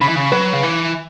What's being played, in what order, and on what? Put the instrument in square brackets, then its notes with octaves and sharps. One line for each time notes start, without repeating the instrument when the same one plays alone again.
[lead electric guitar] C#3 [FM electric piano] B5
[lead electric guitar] E3
C#3
[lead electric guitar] F#3 [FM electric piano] B4
[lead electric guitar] C#3
E3